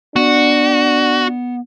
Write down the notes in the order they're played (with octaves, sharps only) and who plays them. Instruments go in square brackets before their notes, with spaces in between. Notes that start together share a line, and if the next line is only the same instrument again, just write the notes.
[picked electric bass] B3 [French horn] D4 [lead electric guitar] F#4